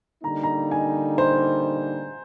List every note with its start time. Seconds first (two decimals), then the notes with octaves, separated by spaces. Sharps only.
0.24 D3 G3 A#3 D#4 A#5
0.43 A#5
0.71 G#5
1.18 C5